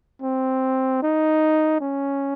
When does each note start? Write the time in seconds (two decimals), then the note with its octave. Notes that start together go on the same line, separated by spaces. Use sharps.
0.22 C4
1.03 D#4
1.81 C#4